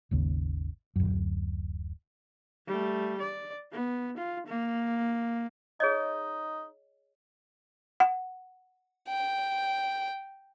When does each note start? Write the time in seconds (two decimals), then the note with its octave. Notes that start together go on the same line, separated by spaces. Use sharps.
0.11 G#1 D#2 C#3
0.96 D1 F#2
2.67 G3 A3
3.19 D5
3.72 B3
4.17 F4
4.47 A#3
5.80 D#4 G#4 C#5 D#5
8.00 F#5
9.09 G5